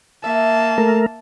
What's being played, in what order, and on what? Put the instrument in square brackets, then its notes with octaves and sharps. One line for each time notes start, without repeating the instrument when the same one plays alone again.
[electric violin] A#3 A5 [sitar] E5
[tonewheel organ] A3 A#4